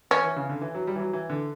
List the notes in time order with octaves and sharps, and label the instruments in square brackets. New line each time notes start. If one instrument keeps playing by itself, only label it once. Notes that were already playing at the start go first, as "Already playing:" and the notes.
[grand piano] E3 [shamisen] C#4
[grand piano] E3
C#3
D3
E3
F#3
G3
E3
F#3
E3
D3